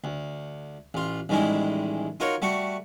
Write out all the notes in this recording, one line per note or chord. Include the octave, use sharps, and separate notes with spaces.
D2
A1 F4
A1 D#3 G3 G#3 E4
D#4 F4 F#4 A#4 C#5
G3 A3 F#4 F#5